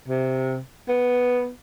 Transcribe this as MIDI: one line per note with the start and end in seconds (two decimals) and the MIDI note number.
0.08 0.58 48
0.88 1.50 59